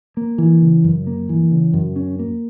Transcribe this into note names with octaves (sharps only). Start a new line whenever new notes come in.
A#3
E3
C#3
F#2
A#3
E3
C#3
F#2
C#4
A#3